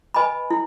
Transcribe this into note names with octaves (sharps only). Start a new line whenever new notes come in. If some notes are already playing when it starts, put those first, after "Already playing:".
B4 D#5 G#5 B5
E4